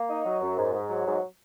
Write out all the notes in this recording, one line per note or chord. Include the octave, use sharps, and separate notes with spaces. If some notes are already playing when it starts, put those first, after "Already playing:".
Already playing: A#3
D#4
F#3
F#2
G#2
G#2
F#3
G#2